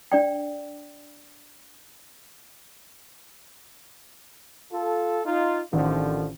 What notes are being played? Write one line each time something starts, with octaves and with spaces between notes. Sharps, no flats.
D4 D5 G5
F4 A4
D#4 F4
A1 D3 D#3 F3